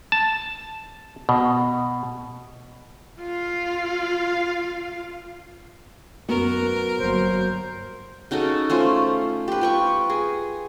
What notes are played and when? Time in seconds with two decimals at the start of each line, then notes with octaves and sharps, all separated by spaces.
0.12 A5
1.29 B2
3.20 F4 F5
6.29 F#2 B3 F#4 A#4
6.99 G1 F#3 A#3 C5
8.31 C#3 D#4 F#4 A4
8.70 A3 C#4 F4 C5
9.48 G4 B4
9.61 F4 G5 C#6
10.10 G#4